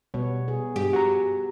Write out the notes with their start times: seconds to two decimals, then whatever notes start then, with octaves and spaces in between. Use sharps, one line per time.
0.14 B2 G3 B3 C#5
0.48 G#4
0.76 G2 G4
0.93 F#4 A#5